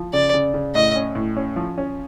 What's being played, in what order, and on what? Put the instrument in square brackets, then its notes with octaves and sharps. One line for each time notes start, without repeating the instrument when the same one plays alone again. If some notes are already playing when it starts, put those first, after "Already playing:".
Already playing: [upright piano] F3
[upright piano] C#3 [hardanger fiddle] D5
[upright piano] C#3
C#3
[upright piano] A2 [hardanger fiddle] D#5
[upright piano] C#4
A2
C#4
F3
C#4